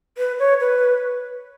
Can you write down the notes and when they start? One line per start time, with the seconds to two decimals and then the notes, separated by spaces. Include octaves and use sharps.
0.18 B4
0.39 C#5
0.60 B4